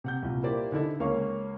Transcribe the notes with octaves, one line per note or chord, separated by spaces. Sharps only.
C3 F#5 G6
C2 A#2
A#3 E4 G4 C5 D5
D3 D#4 E4 A4
C#2 A#3 C#4 F5 C#6